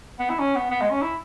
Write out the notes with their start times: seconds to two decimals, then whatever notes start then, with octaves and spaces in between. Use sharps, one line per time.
0.19 B3
0.30 E4
0.39 C#4
0.56 B3
0.70 B3
0.81 G#3
0.91 C#4
1.02 E4